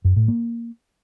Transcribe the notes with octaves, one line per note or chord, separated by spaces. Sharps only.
F#2
A2
A#3